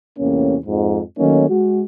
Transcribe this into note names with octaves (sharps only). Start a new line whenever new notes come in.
E2 A2 C3 A#3 C#4
F2 G#2
D#3 F#3 A3 A#3 C#4 D#4
G#3 F#4